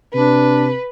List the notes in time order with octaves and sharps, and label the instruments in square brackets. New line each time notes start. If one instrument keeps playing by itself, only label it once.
[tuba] C3 [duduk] D4 [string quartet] B4